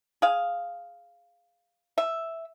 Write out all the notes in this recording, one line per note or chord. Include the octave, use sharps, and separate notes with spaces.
G#4 F5
E5